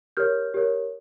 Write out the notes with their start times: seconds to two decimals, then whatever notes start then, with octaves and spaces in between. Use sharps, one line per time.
0.17 G4 A#4 C#5 F6 G6
0.54 G4 A#4 C#5